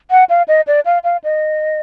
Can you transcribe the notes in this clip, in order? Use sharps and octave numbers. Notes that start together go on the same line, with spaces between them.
F#5
F5
D#5
D5
F5
F5
D#5